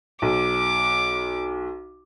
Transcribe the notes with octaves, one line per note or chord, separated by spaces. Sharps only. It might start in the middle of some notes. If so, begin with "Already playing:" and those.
B1 D6